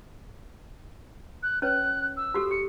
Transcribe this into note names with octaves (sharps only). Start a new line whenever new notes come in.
F#6
C#4 B4 C#5 F#6
E6
F#4 G4 A4
G4 C#7